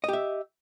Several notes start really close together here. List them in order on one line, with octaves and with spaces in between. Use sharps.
D#5 G4 E5